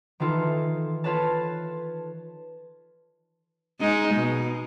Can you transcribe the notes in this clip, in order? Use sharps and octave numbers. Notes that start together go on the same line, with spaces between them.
D#3 E3 D#4 F4 A4
F4 B4 C#5 A5
G#3 D#4
B2